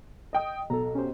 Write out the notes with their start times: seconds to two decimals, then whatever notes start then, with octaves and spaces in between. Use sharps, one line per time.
0.33 D#5 G5 D#6
0.70 B1 A4 A#5
0.95 C#4 G4 C5